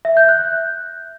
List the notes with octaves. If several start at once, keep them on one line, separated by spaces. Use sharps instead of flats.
E5
G6
F#6